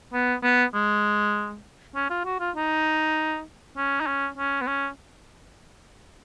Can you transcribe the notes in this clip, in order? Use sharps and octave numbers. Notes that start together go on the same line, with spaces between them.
B3
B3
G#3
C#4
F4
F#4
F4
D#4
C#4
D#4
C#4
C#4
B3
C#4